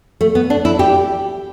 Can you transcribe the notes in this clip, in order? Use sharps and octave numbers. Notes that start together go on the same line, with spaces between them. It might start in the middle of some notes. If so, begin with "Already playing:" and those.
A3
B3
D4
E4
G4